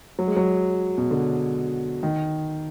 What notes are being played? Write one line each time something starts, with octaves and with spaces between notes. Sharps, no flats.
F#3
G#3
F#3
B2
D3
D#3